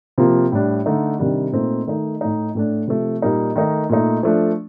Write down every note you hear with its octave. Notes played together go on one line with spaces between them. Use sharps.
C3 F3 A#3 F4
A2 G3 D4
D3 A3 D#4
C3 D#3 G3 D4
A#2 A3 C4 D#4
D#3 A3 D#4
A2 A3 D#4
A2 A3 D4
C3 F3 A3
A#2 G3 A#3 D#4
D#3 A3 D#4
A#2 A3 D#4
F3 A3 D4